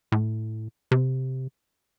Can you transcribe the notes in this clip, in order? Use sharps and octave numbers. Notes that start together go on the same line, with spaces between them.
A2
C3